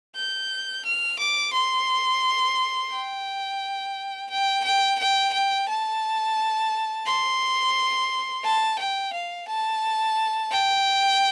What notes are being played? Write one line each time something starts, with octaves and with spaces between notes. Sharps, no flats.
G6
F6
D6
C6
G5
G5
G5
G5
G5
A5
C6
A5
G5
F5
A5
G5